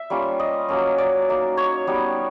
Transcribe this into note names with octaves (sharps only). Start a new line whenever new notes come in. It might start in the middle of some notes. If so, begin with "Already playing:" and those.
Already playing: E5
G3 A#3 C#4 F4
D#5
F#3 A#3 C#4
D5
A#3 D#4
C#5
G3 B3 D#4